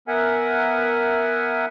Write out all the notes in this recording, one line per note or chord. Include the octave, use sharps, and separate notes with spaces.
B3 A#4 E5 F#5 G#5